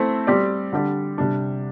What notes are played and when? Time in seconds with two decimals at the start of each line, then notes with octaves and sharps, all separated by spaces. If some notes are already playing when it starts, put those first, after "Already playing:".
Already playing: A3 C4 E4 C5
0.27 G3 C4 G4 D5
0.72 D3 G3 D4 G4 D5
1.18 C3 G3 D4